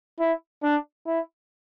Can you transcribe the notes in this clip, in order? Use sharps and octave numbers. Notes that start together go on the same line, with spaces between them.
E4
D4
E4